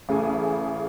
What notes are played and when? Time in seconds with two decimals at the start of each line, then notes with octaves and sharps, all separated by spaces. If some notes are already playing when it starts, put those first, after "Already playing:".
0.09 A1 C#3 A4 G#5